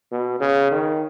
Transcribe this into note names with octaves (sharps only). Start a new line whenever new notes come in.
B2
C#3
D#3